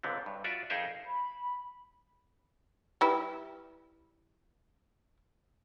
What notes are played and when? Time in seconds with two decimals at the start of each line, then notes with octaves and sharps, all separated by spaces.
0.03 C#2 G#2 D3 B3 C4
0.26 G2
0.44 F4 F#4 D5 E5
0.70 F2 D#4 G#4 A#4 C5 E5
1.05 B5
3.01 G3 E4 B4